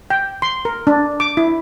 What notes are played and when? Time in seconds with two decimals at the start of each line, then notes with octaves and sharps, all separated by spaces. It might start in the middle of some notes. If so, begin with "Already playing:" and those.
0.10 G5
0.42 C6
0.65 A#4
0.87 D4
1.20 D6
1.37 E4